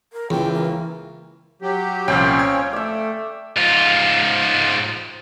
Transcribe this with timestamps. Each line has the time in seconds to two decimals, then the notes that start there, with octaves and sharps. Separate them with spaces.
0.13 A#4
0.30 C#2 E3 G5
0.53 A#3
1.62 F#3 G4
2.08 C2 A#2 F3 C4 C#4 F5 G5
2.39 G#6
2.73 A3 D5 E5
3.56 G#2 F4